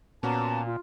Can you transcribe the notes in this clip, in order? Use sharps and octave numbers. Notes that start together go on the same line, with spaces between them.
A#2 B3 C#4 F#4 A5 A#5 D6
F4